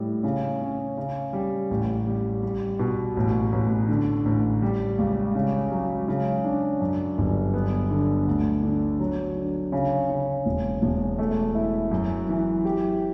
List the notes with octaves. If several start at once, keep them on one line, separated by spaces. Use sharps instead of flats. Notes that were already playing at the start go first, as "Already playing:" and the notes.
Already playing: A2 G3
C#3
C#4
C#3
G3
A1
G3
G3
B2
A1
A1
D3
A1
G3
C#2
C#3
F#3
C#3
D4
F#2
G1
B3
D3
D2
D3
F#3
D3
C#3
C#3
E1
E1
A3
E4
F#2
E3
G4